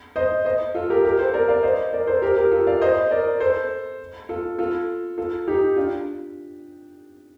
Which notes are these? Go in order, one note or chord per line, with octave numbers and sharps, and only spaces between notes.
C5 D#5
C5 D#5
F4 A4
G4 A#4
G4 A#4
A4 C5
A#4 D5
D5 F5
C5 D#5
A#4 D5
A4 C5
G4 A#4
G4 A#4
F4 A4
D5 F5
C5 D#5
A#4 D5
A4 C5
F4 A4
F4 A4
F4 A4
D#4 G4
D4 F4